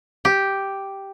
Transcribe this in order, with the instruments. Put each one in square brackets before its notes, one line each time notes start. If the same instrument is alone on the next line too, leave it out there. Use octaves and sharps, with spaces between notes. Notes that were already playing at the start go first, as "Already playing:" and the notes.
[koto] G4